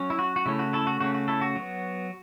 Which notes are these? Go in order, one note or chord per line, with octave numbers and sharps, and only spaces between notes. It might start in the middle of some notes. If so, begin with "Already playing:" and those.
Already playing: F#3 C#4
E4
F#4
F#4
C#3 A3 C#4 E4
F#4
E4 A4
F#4
C#3 A3 C#4 F#4
F#4
E4 A4
F#4
F#3 B3